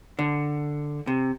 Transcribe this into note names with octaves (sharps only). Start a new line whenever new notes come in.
D3
C3